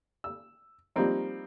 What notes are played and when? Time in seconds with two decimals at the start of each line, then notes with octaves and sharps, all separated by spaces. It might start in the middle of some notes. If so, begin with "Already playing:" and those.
0.24 E6
0.96 F3 G3 A#3 C4 D#4